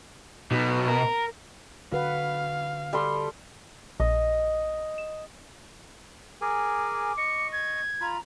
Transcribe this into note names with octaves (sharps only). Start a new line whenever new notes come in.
B2 F#3 D#4
A#4
D3 F#4 B4 F5 F#5
G3 A4 C6
A#1 D#5
E7
G#4 A#4 G#5 D6
D#5 C#6 C#7
G#6
F4 A#5 B5